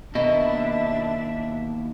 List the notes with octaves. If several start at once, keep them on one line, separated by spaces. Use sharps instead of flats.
D#2 B2 A#3 D4 E4 D#5 E5